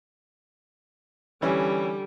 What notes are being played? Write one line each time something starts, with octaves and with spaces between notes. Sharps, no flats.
D3 E3 G3 C#4